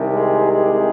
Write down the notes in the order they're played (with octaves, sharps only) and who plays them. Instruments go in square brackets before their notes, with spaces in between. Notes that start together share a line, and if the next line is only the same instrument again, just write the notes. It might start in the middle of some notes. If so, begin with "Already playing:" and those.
Already playing: [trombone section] C2 C3 D#3
G#3
G#3